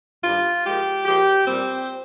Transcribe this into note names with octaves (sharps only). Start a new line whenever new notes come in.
G2 D#3 G3 F4
A#2 F3 G#3 G4
A#2 F3 G#3 G4
A#2 G3 C4